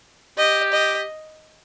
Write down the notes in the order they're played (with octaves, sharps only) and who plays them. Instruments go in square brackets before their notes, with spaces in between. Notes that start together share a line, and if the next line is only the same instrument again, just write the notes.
[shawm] G4 [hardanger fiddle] D#5
[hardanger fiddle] D#5